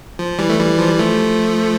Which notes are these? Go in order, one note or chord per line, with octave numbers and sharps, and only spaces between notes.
F3
E3 G3
A3
E3 G3
F3
G3
F3 A3